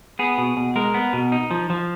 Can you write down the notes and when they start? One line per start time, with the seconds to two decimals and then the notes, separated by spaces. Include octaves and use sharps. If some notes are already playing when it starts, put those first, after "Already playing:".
0.19 B3 G#4
0.38 B2
0.57 B2
0.76 G#3 A#4
0.94 B3
1.13 B2
1.32 D#4
1.51 F3
1.70 F3